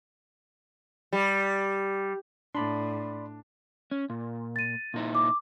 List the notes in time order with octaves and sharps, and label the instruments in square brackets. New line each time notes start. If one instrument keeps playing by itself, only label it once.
[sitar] G3
[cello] A2 [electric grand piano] D4 [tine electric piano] D5 B5 C6
[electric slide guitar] C#4
A#2
[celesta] A6 D#7
[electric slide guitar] A#2 D#4 E4
[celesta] D6